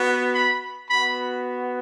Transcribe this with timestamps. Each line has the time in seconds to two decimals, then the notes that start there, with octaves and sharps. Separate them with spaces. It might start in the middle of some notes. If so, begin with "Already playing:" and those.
Already playing: B3 F#4
0.35 B5
0.89 B3 F#4 B5